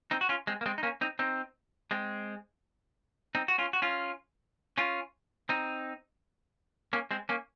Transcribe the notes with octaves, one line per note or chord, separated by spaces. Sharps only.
C4 D#4
F#4
C#4 F4
G#3 C4
A#3
G#3 C4
D#4
A#3 C#4
C4 D#4
C4 D#4
G#3 C4
C4 D#4
F#4
C#4 F4
F#4
C#4 F4
C#4 F4
C4 D#4
A#3 C#4
G#3 C4
A#3 C#4